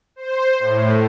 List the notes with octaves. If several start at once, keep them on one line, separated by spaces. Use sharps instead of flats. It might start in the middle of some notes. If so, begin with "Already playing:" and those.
C5
A2